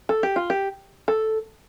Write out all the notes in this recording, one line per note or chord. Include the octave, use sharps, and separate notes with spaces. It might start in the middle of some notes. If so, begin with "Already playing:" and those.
A4
G4
F4
G4
A4